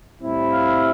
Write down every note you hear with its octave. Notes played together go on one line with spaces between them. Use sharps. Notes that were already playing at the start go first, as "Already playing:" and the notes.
A2 G3 C4 E4
F5